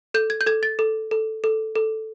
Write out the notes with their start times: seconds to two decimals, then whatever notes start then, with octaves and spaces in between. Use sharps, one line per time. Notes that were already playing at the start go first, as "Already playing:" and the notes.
0.14 A4 G6
0.30 G#6
0.41 G6
0.46 A4 G#6
0.63 A6
0.79 A4
1.11 A4
1.44 A4
1.76 A4